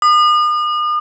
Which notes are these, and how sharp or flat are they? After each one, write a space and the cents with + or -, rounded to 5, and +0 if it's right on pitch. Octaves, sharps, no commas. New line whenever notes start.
D#6 -45